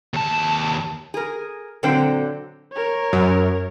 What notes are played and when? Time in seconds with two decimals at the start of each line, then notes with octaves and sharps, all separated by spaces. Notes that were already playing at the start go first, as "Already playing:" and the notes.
0.14 D#2 A5
1.14 G#4 A#4
1.83 A#2 D3 F#3 C4 C5 G5
2.73 A#4 C#5
3.13 F#2